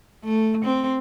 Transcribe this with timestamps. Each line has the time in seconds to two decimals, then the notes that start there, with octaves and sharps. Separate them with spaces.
0.24 A3
0.65 C4